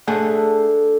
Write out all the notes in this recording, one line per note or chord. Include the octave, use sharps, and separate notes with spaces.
D3 A3 G#4 F#5